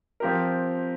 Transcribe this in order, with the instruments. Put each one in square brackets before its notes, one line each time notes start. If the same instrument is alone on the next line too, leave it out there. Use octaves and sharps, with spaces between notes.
[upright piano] F3 C4 G4 A#4